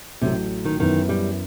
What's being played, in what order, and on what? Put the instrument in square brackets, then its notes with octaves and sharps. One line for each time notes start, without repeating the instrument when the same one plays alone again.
[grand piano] A1 A2 F#3 A3 [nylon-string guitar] C3
[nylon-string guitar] D#3
[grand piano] F#2 E3 B3 E4 [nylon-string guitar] D#3
[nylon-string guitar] G3